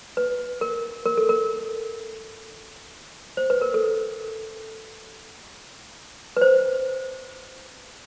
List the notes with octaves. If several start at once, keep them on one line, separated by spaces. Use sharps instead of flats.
B4
A#4
A#4
A4
A#4
C5
B4
A#4
A4
B4
C5